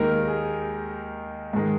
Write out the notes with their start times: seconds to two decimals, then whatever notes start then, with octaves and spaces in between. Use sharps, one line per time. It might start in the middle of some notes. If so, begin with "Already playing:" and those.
Already playing: D#2 D#3 G#3 A#4
0.28 G#4
1.53 G#2 D#3 G#3